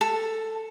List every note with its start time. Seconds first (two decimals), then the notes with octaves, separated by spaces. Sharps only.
0.01 A4